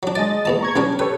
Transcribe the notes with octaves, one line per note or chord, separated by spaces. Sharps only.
F#3 D4
G#3 D5 D#5 A6
A#1 E2 A5
A#5 C#6 G#6
B1 G3 C#4 D4
G4 A4 B4 C#5